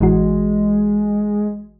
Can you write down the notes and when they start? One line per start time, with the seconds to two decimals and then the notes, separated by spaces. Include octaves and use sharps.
0.01 A1 E3 G#3 F#4